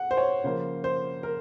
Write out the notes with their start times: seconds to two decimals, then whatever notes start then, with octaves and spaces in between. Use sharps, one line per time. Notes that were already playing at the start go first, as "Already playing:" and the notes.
Already playing: F#5
0.11 C5
0.17 C#5
0.44 C#3 F3 A#3 C5
0.84 C5
1.23 A#4